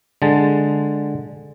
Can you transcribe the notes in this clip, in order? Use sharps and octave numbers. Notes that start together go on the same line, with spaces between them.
D3 G#3 A5